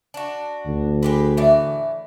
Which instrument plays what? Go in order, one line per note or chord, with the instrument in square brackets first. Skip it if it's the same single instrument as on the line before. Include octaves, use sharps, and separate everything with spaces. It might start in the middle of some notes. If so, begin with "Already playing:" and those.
[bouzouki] D4 F#4
[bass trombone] D2
[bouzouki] G#3 G4 B4
A2 E3 D5